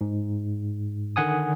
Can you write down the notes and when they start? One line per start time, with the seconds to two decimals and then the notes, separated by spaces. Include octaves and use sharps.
0.01 G#2
1.16 D3 D#3 F#5 G#5 D#6